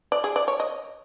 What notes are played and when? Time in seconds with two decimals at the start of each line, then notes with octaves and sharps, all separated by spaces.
0.12 D5
0.24 G#4
0.36 D5
0.48 C#5
0.60 D#5